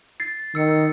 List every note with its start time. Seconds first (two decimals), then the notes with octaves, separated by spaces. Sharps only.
0.20 A6 C7
0.55 D#3 E6 C#7